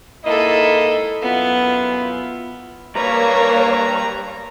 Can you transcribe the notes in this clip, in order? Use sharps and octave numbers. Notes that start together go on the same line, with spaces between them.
G#2 A#3 E4 A4 D#5
F#2 B3 E4 F4
G3 A#3 B4 C#5 A#5